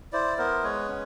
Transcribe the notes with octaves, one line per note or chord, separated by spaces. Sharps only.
E4 C5 D5
B3 A#4 C5
G#3 B4 C#5
C#4